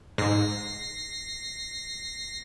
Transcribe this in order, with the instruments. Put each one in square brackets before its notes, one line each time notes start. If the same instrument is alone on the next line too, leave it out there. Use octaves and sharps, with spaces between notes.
[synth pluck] G#2 [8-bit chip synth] A#6 C7